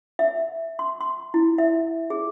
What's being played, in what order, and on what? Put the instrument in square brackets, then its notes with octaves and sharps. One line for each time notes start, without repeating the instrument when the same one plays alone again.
[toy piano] E5
C6
C6
E4
E5
G#4